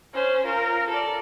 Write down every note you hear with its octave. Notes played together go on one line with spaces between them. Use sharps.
C#4 C5
F4 A#4
A4 D5